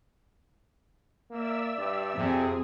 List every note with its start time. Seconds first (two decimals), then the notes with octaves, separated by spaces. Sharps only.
1.31 A#3 D5 E5 E6
1.78 G2
2.16 F2 C3 G#4